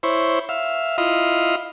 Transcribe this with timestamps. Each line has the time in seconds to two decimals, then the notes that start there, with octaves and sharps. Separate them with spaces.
0.03 E4 C5 C#5
0.49 E5 F5
0.98 E4 F4 D#5 F5